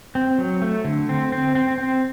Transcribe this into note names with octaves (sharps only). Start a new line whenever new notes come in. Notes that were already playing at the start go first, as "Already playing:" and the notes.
C4
F#3
A3
D3
C4
C4
C4
C4